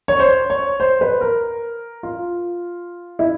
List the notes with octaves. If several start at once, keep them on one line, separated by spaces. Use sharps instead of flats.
C#5
C5
C#5
C5
B4
A#4
F4
E4